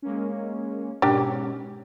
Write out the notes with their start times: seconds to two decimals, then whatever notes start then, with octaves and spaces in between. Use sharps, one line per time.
0.02 G#3 A#3 C#4
1.02 G#2 B2 C#4 D4 G4 A#4